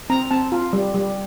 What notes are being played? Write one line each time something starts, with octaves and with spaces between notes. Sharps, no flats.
C4 A#5
C4 A5
F4
G3
G3